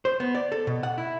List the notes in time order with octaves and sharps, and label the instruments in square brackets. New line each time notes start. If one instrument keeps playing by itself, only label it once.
[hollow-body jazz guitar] C5
B3
D5
A4
B2
F#5
E4